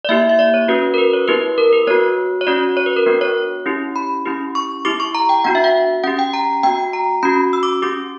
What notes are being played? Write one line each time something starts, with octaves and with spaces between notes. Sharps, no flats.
D5
A#3 E4 G4 E5
E5
D5
C#5
C#4 F#4 B4
A#4
B4
C#5
B3 E4 G4 B4
A#4
B4
B3 F#4 C#5
C#5
C#4 F#4 D5
C#5
B4
A#4
B3 D4 F#4
C#5
C#4 E4 G4
B5
C#4 E4 G4
C#6
B3 E4 G4 D6
C#6
A#5
G5
B3 D4 F#4 F#5
E5
F#5
C#4 G4 F#5
G5
A#5
B3 F#4 G5
A#5
C#4 F#4 B5
E6
D6
C#4 G4 D6